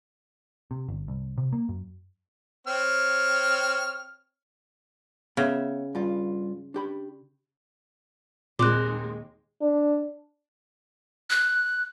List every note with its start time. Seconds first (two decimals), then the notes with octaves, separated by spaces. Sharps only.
0.71 C3
0.88 G1
1.08 C2
1.38 C3
1.53 A#3
1.69 F#2
2.67 C4 C#5 F6
5.37 C#3 B3 C#5 E5
5.95 G2 F4
6.74 D4 G4 B5
8.59 D#2 A#2 G#3 C4 A#4 D6 F#6
9.62 D4
11.30 F#6